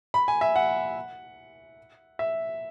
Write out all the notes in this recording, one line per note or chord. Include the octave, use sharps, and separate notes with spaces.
B5
G#5
E5
F#5
E5